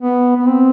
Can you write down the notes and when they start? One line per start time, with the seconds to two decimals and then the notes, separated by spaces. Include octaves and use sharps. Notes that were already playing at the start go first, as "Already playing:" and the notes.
0.02 B3
0.36 B3
0.48 C4